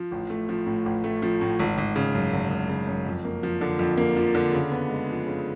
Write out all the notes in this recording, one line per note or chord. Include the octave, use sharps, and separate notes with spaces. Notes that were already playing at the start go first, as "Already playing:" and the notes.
Already playing: F3
A1
A3
F3
A2
A1
A3
F3
A2
G#1
G#1
C#3
F#2
G#1
G#1
C#3
F#2
F2
A#3
F3
D3
F2
A#3
F3
D3
C#3
B3
G#3
F3
C#3